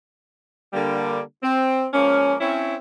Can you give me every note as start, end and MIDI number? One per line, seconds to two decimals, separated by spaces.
0.73 1.21 50
0.73 1.21 55
0.73 1.21 58
1.43 1.85 60
1.93 2.36 53
1.93 2.36 56
1.93 2.36 58
1.93 2.36 61
2.41 2.75 60
2.41 2.75 61
2.41 2.75 64